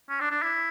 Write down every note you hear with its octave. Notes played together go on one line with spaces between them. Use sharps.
C#4
D4
D4
E4